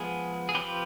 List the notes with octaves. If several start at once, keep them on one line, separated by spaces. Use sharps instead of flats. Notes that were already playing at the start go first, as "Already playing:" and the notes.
Already playing: F3 G#3 B3 G#4
G#4
F3 C4 F4 G4 B4